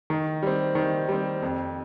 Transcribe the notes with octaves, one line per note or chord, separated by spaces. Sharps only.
D#3
G3 C4
D#3
G3 C4
F2